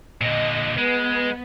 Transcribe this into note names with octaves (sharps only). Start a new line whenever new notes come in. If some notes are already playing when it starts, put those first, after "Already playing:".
A#2 D3 D#5
G#3 B3